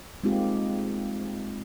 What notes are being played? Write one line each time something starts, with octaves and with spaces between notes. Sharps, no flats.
G#3 A#3 C4 D#4 F4 G4